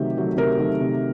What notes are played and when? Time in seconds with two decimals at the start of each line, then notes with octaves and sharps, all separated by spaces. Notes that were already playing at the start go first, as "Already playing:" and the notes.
Already playing: C3 D#3 F#3 A3 G4
0.16 D#3 F#3 A3
0.37 C3 A#4
0.59 D#3 F#3 A3
0.80 C3